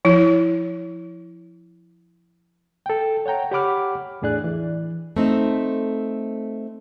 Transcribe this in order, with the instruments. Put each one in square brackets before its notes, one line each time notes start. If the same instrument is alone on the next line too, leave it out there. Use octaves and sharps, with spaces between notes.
[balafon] F3 E4
[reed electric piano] A4 G5
C#5 F#5 G5 A#5
G4 C#5 F#5 B5 D6 F6
E2 A2 D4 G#4 D5 F#6
E3
[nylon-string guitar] A3 C4 D#4